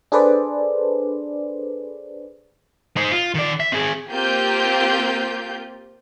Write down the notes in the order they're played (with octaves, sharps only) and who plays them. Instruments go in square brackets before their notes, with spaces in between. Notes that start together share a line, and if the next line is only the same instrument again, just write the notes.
[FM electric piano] D4 G#4 A4 B4 C5 D5
[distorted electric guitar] D#4 C5
F4
D#3 D5
E5
C4 G#4
[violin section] A#3 C4 F4 G4 G6